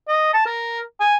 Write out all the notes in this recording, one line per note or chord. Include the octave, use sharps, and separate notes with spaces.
D#5
A5
A#4
G#5